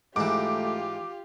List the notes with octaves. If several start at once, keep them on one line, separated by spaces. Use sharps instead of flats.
G#2 E3 A3 F4 G4 D6